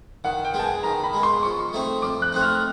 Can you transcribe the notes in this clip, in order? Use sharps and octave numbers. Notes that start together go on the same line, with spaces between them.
D#3 F#5
G5
G#3 B3
A5
G#5
D#3 A#5
B5
G#3 B3
C6
F3 C#6
A3 C4 D#4
F3 D6
F#6
A3 C4 D#4 F#6
F6